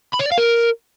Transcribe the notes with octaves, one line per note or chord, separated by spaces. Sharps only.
B5
C#5
D5
F5
A#4